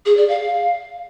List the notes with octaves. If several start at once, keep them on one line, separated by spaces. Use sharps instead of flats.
G#4
D5
F5